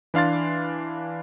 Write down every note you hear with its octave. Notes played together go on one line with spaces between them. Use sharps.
E3 D4 F5 C6 A6